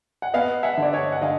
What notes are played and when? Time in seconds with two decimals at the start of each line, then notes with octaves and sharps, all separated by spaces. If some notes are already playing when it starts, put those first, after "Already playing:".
0.22 F#5
0.34 B3 D#5 F5
0.63 E5 F#5
0.77 D3
0.82 D5
0.93 C#5 D#5
1.12 F#5
1.21 D3 D#5 F5